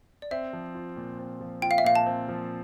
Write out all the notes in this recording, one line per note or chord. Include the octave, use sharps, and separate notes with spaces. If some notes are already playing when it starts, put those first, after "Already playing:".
D5
C4 E5
F3
F4
A#2
C4
F3
F4 G5
F5
E5
A#2 F5
A5
C4
F3